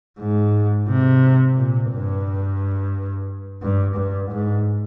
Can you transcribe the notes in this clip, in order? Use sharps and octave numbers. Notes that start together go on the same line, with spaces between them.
G#2
C3
A#2
G2
G2
G2
G#2